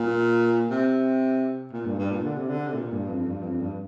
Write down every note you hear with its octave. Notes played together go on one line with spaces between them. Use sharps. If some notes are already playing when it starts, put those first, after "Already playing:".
Already playing: A#2
C3
A#2
G2
G2
A#2
D3
C3
D3
C3
A#2
G2
F2
G2
F2
G2